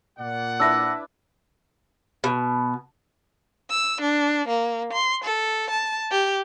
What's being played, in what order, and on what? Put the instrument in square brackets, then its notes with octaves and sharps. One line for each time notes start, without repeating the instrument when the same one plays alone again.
[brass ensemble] A#2 D5 F#5
[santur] D4 E4 B4 [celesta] E6 A#6
[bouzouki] B2
[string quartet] E6
D4
A#3
C6
A4
A5
G4